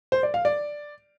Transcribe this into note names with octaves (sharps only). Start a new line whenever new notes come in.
C5
D5
F5
D5